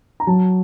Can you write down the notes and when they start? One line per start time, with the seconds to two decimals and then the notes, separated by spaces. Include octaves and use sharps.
0.20 A#5
0.27 F#3 A5